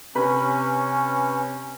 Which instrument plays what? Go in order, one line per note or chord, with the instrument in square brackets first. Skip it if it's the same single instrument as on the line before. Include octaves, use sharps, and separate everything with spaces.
[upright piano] C3 B4 B5 [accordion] C#4